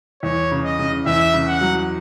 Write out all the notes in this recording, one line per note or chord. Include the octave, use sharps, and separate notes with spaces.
E2 C#5
C#3
D#5
C#3
E2 E5
C#3
F#5
F#3